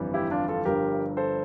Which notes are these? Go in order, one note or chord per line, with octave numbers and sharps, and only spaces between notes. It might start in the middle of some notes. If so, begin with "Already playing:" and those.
Already playing: G1 F2 E3 G3
E4 G4
D4 F4
F4 A4
G1 G2 F3 G4 A#4
A4 C5